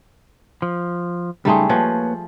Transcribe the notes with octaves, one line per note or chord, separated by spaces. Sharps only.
F3
C#2 G3 A3 D#4 G#4 C6
F3 A#3 B4 C#5